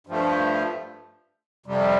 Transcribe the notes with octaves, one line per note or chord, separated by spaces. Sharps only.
G2 F3 A3
F2 C3 G3